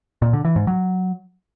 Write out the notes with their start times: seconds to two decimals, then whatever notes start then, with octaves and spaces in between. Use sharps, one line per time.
0.22 A#2
0.33 D3
0.45 E3
0.56 G#2
0.67 F#3